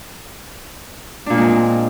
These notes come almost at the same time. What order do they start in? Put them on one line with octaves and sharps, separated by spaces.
D4 A#2 A#3 G#3 C4